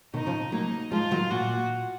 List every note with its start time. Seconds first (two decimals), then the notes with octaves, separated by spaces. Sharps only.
0.14 B2 D#3 D#4
0.26 C#3 F3
0.52 F#3 A#3 D#4
0.91 F3 G#3 F4
1.11 D#3 F#3
1.30 A#2 F#4